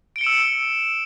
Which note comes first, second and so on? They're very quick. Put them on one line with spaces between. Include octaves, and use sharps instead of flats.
D7 G7 C#7 E7 E6